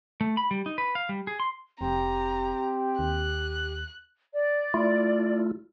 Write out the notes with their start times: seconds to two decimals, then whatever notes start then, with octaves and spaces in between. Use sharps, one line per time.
0.21 A3
0.37 B5
0.51 G3
0.66 D#4
0.78 B4
0.95 F5
1.09 G3
1.27 G#4
1.40 C6
1.81 F1 C4 G4 A#5
2.99 D#2 F#6
4.34 D5
4.74 A3 E4 F4